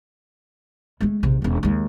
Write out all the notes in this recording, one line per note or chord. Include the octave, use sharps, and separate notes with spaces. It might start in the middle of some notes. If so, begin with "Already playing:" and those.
G#3 A3
A#1 C3
E1 C#4
D#2 G#3